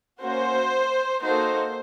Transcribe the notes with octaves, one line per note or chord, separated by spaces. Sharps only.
A#3 C#4 F#4 C5
A#3 D#4 F#4 A4 C5